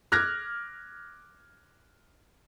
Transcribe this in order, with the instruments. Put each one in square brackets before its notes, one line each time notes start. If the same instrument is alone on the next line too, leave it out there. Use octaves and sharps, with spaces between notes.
[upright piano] D6 F6 F#6 G#6 A#6